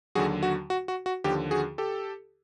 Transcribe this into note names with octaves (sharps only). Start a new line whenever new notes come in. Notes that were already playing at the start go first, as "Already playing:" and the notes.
D#2 D3 F#3 F#4 G#4
F#4
F#4
F#4
F#4
D#2 D3 F3 G4
F#4 G#4
G4 A4